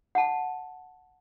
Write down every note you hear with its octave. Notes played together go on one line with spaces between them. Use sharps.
F#5 A5